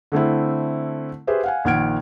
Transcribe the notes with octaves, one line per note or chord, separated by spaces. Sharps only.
D3 A3 C4 E4
G4 G#4 B4 C5 E5
F5 F#5 G#5
A#1 D#3 F#5 F6 G#6 D7